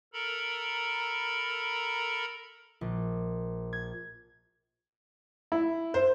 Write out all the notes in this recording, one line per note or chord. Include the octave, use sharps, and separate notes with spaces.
A4 A#4 A#5 B5
A#1
G#6
E4
C5